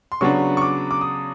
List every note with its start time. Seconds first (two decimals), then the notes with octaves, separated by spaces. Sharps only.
0.12 C6
0.21 C#3 F#3 B3 D4 C#6
0.57 C#6
0.62 D6
0.91 D6
1.01 D#6